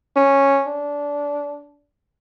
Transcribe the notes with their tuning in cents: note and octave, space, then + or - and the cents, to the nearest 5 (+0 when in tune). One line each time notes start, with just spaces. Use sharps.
C#4 -5
D4 -20